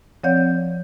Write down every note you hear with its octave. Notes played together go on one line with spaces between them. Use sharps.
F3 C4 C#5 D5 F#5 G6